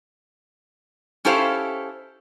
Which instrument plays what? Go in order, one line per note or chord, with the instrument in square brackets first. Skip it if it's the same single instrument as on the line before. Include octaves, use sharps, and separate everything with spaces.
[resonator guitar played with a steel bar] C#4 E4 G4 A4 C5 F5